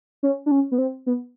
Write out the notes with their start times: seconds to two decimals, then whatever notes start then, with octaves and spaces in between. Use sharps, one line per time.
0.23 C#4
0.46 D4
0.51 C#4
0.72 B3
0.78 C4
1.07 B3